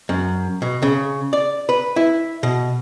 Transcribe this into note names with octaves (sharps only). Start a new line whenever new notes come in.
F#2
B2
C#3
D5
B4
E4
B2